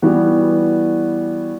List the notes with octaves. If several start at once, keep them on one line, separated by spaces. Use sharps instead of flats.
E3 G3 B3 F#4